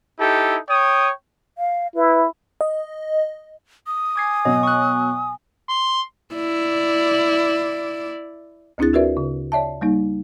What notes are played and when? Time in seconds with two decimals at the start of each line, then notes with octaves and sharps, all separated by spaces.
0.20 D#4 E4 G4 A4
0.69 C#5 G5 D#6
1.58 F5
1.95 E4 B4
2.61 D#5
3.87 D#6
4.16 G#5 D6 G#6 C7
4.45 B2 F#3 D#5
4.63 C#6 F#6
5.69 C6
6.35 E4 D5
8.78 D2 C4 D4 E4 G#4 A6
8.93 F4 F#4 A#4 B4 D5 E5
9.17 C#3
9.52 C#5 D5 E5 A5
9.81 G3 A#3 D#4